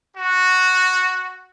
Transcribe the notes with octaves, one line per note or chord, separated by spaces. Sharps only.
F#4